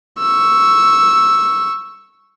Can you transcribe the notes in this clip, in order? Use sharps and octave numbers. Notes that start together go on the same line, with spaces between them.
C#6 E6